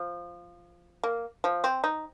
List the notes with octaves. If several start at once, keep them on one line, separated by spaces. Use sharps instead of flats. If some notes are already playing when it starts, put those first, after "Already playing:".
Already playing: F3
A#3
F3
C4
D#4